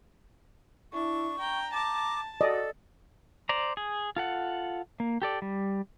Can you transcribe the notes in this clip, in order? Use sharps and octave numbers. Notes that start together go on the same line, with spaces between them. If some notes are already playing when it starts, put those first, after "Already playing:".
D4 E4 C#6
G5 A#5
A5 D6
F#4 A4 D5 D#5
C5 D5 A#5
G#4
F4 A4 F#5
A#3
G4 A4 D5
G3